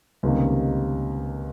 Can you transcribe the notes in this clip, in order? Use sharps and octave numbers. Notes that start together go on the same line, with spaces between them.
C#2 C3 D#3 G3 A#3